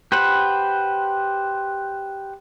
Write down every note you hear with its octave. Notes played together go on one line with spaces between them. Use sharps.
G4 B4 C5 F#5